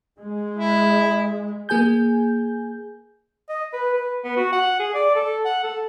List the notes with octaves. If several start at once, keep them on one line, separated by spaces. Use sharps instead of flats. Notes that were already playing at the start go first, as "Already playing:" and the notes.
G#3
E4
A#3 G#4 G#5 G6
D#5
B4
B4
B3
F#4
F#5
G#4
D5
A4
F#5
A4